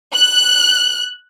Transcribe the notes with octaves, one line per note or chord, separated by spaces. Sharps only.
F#6